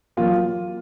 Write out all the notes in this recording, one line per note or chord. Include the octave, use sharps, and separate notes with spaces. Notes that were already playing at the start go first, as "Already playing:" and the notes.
F#3 A#3 F4